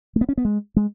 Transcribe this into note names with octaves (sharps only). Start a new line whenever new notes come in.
A3
B3
C#4
B3
G#3
G#3